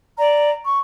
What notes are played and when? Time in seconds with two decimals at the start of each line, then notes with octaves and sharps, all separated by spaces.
0.18 D5 A#5
0.66 C#6